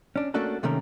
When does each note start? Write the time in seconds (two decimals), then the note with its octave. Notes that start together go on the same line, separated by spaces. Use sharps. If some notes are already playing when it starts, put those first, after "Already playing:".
0.16 C#4 D4
0.34 A3 A#3 C#4 D4 F#4 A4
0.63 C3 D#3 A3 A#3 C#4 A#4